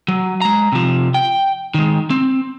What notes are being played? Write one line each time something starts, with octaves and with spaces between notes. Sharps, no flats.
F#3
G#3 A#5
C3 F3
G5
D#3 G#3
C4